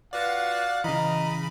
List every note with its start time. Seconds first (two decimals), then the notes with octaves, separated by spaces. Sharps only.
0.13 F4 F#4 B4 D5 F5 F#5 A6
0.84 C#3 E3 D#5 A#5 B5